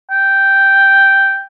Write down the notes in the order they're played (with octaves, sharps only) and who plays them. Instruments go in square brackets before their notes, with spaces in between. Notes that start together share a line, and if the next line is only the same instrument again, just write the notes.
[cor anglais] G5